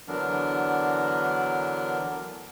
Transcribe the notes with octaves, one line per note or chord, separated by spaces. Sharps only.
D3 E3 F#3 B3 D4 A#4